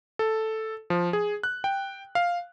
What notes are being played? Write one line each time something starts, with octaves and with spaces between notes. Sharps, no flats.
A4
F3
G#4
F#6
G5
F5